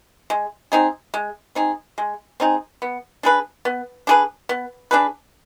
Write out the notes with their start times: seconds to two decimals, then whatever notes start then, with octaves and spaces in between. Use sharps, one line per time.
0.30 G#3
0.72 C4 D#4 G#4
1.14 G#3
1.55 C4 D#4 G#4
1.98 G#3
2.40 C4 D#4 G#4
2.82 B3
3.23 D4 G#4 B4
3.65 B3
4.07 D4 G#4 B4
4.49 B3
4.91 D4 G#4 B4